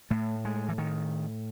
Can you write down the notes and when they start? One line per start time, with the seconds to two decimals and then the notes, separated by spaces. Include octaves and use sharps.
0.10 A2 A3
0.45 G#3
0.69 E3
0.78 D#3